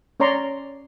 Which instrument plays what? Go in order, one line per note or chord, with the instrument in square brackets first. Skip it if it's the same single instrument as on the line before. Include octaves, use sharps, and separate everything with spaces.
[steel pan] C#4 C#5 D5 A#5 C6 C#6